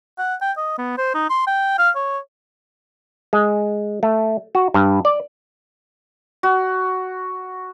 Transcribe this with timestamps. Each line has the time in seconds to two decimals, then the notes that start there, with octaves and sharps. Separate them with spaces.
0.19 F#5
0.42 G5
0.57 D#5
0.78 B3
0.98 C5
1.15 D#4
1.30 C6
1.47 G5
1.79 F5
1.96 C#5
3.33 G#3
4.03 A3
4.55 F#4
4.74 G2
5.05 D5
6.43 F#4